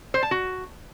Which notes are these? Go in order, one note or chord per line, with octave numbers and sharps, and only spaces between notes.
C5
A5
F#4